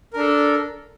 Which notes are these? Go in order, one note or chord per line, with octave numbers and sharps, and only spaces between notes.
D4 A4 A#4